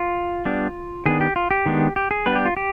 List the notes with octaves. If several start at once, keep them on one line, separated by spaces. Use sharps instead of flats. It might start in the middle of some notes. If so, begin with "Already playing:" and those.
Already playing: F4
G3 B3 D4
D#3 B3 D4 G#4
G4
F4
G4
D#3 G#3 B3 D4
G4
G#4
G3 B3 D4 B4
G4
F4
G4